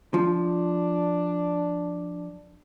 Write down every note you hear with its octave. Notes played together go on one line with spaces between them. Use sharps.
F3 D4